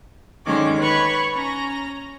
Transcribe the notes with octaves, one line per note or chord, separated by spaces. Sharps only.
D3 D#3 G#3 C#4 D6
B4 C#5 B5 C#6 A6
C#4 A#5 A#6